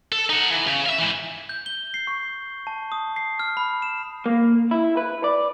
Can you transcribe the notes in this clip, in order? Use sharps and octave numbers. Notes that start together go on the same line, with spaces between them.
A4
D#4 F#5
E3
C#3
E5 F5
G#2 E3
G6
G7
C7
C#6
A5
D#6
C7
F6
B5
E7
A#3
E4
B4
D5